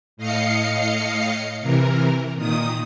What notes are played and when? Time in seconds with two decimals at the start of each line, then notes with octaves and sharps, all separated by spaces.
0.17 A2 D#5 F5 C7 C#7
1.61 C3 E3 A#4
2.35 A#2 D#3 D#6